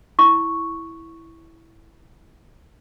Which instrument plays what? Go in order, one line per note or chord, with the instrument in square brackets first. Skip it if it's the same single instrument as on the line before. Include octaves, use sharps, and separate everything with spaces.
[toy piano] E4 C#6